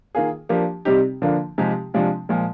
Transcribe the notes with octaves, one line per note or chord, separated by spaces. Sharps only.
D#3 A#3 F4 G#4
F3 A#3 D4 G4
C3 G3 C4 D#4 G4
D3 F3 A#3 D4 F4
C3 F3 G#3 D#4 G4
C3 F3 G#3 D4 F4
A#2 F3 G#3